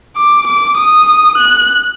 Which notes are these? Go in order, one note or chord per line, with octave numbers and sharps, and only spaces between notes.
D6
D6
D#6
F#6